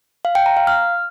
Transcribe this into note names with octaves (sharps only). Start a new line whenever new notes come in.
F5
G5
A#5
F5
F6